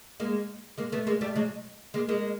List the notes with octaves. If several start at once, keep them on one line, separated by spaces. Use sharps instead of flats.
G#3 A#3
G#3 A#3
A3 B3
G#3 A#3
G3 A3
F#3 G#3
G#3 A#3
G#3 A#3